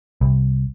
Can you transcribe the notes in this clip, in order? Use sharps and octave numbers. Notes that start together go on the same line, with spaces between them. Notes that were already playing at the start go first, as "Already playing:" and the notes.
C2